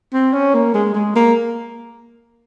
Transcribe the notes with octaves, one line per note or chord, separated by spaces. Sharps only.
C4
C#4
A#3
G#3
G#3
A#3